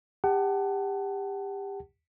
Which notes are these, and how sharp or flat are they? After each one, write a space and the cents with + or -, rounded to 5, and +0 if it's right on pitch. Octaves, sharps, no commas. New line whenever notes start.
G4 +25 F#5 +30 A5 +0